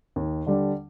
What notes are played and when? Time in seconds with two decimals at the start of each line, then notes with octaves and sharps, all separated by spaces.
0.16 D#2
0.47 D3 G3 D4